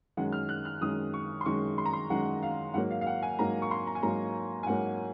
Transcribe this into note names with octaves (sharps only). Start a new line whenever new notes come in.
F#2 D#3 G#3 F#5
F6
F#6
F6
F#2 D#3 G#3 D#6
C#6
C6
F#2 D#3 G#3 C#6
C6
A#5
C6
F#2 D#3 G#3 F#5
F5
G#2 F#3 A#3 F#5
F5
F5
F#5
G#5
G#2 F#3 A#3 A#5
C#6
C6
A#5
G#5
G#2 F#3 A#3 A#5
G#5
G#2 F#3 A#3 F#5